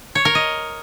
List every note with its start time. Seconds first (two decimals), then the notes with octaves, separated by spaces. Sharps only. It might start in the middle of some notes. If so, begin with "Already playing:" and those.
0.15 C#5
0.25 A#4
0.35 D#5